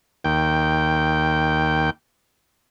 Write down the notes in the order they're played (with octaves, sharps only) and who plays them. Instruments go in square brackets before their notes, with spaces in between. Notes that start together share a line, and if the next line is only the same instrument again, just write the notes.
[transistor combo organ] D#2 G5